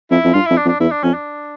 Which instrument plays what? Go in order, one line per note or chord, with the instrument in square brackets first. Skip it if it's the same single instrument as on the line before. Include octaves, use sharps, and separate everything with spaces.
[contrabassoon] F2 [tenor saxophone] E4
[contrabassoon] F2
[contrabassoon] G2 [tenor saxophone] F4
[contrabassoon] F2 [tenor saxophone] E4
[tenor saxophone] D4
[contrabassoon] F2
[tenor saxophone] D4
[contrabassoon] E2 [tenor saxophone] E4
[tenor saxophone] D4
[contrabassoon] F2 [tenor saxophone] C#4
[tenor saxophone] D4